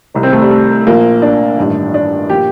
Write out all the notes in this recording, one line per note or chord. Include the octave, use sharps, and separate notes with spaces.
C2 C3 D#3
C4
A3
G3
A3
A#1 A#2 F3 A#3
D4
A1 G2 D#3
D4
A#2 F3 G4